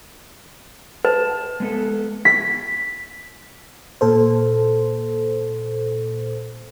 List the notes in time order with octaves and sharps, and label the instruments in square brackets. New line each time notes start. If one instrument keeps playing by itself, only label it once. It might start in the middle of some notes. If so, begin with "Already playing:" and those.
[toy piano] B4 [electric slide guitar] A5
[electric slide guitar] G#3 B3 A4
[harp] B6
[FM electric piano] A#2 A4 C5